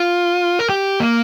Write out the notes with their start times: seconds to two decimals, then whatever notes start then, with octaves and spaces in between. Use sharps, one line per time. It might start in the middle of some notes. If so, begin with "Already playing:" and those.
Already playing: F4
0.59 A#4
0.69 G4
1.00 A#3